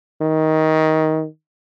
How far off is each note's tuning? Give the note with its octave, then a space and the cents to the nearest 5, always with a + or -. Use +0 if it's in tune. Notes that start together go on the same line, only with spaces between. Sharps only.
D#3 +15